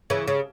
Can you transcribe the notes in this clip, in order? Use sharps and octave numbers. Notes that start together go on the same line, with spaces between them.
C#3 E3
C#3